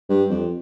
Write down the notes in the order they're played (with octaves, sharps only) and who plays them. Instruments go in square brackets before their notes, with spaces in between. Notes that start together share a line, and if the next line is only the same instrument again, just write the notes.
[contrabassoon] G2
F2